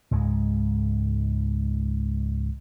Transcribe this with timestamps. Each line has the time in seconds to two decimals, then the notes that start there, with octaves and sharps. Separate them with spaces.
0.11 C#2 G#2 G#3